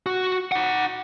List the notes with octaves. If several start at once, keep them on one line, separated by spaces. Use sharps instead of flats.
F#4
D#4 F#5